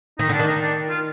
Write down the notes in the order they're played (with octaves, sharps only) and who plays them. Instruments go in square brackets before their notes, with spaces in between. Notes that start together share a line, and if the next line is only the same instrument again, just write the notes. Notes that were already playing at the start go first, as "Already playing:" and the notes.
[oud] D#3 [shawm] D#4
[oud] D3 [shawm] D4
[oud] D#3
[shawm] D#4
D4
F4